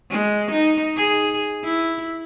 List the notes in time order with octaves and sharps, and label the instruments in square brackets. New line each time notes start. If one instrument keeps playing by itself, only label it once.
[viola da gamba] G#3
D#4
G#4
E4